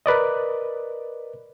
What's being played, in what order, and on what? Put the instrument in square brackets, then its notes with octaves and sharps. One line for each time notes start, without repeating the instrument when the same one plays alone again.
[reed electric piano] A#4 B4 D5 D#5